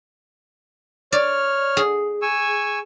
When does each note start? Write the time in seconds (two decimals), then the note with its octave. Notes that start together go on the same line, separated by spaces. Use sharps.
1.12 C#5 D5 F6
1.77 G#4
2.22 G#5 C#6 E6